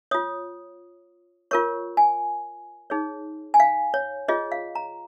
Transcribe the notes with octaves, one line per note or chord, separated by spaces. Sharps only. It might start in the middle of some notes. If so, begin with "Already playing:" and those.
F4 C#5 D#6
F4 A#4 C#5 C#6
G#5
D#4 G#4 C#5
G#5
F5
C#5
F4 G#4 C#5 D#5
F5
A#5